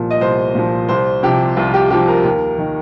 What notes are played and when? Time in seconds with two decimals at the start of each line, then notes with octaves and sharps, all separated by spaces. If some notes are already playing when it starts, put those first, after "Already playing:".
Already playing: C2 A#2 F3
0.10 D#5
0.21 C2 C5
0.55 A#2 F3
0.89 C2 C5
1.23 C3 F3 G4
1.57 C2 F4
1.74 G4
1.90 C3 F3 G4
2.08 A#4
2.24 D#2
2.58 D#3